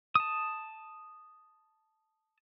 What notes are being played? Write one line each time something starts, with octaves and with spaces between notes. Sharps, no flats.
A5 D#6